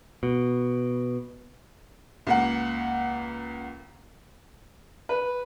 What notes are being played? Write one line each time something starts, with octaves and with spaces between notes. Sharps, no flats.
B2
C#2 A#3 F#5
B4